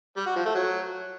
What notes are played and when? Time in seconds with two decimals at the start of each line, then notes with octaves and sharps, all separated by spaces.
0.17 G3
0.26 F#4
0.36 F3
0.45 A3
0.55 F#3